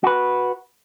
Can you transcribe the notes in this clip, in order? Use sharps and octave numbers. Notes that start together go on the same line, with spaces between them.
F#4 B4